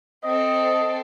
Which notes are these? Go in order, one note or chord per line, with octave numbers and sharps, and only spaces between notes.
C4 A4 D#5